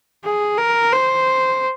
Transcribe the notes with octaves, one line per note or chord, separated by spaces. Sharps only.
G#4
A#4
C5